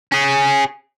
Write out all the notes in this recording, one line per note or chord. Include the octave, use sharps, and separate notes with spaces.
C#4 G#4